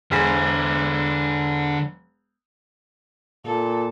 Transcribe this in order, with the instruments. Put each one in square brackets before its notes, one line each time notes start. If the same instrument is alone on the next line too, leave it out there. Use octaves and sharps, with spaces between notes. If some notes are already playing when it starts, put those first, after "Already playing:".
[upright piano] E1 G#4 B6 [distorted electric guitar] D3 C5
[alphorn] A#2 [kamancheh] A4